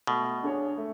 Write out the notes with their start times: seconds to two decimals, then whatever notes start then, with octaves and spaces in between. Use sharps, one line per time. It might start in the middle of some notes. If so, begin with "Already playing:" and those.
0.07 B2 A3
0.43 D4 G#4 C#5
0.77 A3